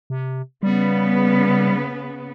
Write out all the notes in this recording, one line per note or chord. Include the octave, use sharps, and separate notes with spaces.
C3
C#3 G3 B3 B4